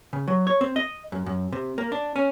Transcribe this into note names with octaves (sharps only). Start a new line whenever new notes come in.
C#3
F#3
C#5
C4
D#5
F#2
F#2
C3
A#3
D4
C#4